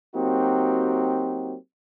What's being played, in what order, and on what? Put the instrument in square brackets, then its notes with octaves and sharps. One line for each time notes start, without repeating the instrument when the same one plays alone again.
[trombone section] F#3 A#3 C4 D#4 F#4 G4